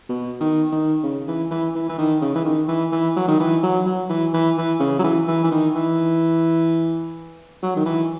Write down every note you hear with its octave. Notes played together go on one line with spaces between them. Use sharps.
B2
D#3
D#3
C#3
E3
E3
E3
E3
D#3
C#3
E3
D#3
E3
E3
F#3
D#3
E3
F#3
F#3
E3
E3
E3
C#3
F#3
E3
E3
E3
D#3
E3
F#3
D#3
E3